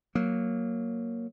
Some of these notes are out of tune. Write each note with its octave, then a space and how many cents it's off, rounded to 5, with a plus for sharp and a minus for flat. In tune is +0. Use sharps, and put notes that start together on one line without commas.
F#3 +0 A#3 +0